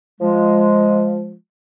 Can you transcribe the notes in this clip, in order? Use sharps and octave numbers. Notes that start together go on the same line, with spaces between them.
F3 G#3